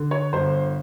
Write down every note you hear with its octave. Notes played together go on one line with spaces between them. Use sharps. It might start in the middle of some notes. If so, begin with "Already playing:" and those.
Already playing: D3
C#5
G1 C5